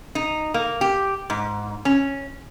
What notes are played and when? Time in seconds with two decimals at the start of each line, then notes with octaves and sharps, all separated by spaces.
0.15 D#4
0.54 A#3
0.81 G4
1.30 G#2
1.85 C#4